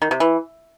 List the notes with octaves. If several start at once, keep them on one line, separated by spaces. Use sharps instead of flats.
D#3
C3
E3